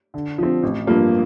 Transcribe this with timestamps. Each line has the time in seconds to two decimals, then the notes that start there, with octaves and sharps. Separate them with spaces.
0.14 D3
0.38 F3 C4
0.63 A1
0.87 G2 F3 A#3 F4